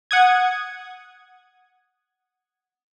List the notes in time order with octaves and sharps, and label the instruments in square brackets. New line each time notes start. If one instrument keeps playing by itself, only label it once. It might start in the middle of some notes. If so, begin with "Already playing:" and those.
[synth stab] F#5 D#6 G#6